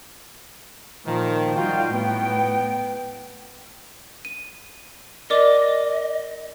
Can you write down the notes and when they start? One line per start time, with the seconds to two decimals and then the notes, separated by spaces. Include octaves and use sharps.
1.06 A#2 D#3 F3
1.56 G3 D#4 F4 F#4 G5
1.93 A2 B3 G5
4.25 D#7
5.30 A#4 D5 D#5 D6